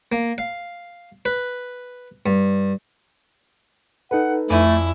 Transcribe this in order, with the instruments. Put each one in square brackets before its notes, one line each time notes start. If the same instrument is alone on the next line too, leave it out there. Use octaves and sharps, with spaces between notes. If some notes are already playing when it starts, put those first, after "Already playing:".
[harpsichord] A#3
F5
B4
G2
[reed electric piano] D#4 A4 B4 [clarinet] F#5
[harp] F2 D5 G#5 [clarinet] A3 [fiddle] E4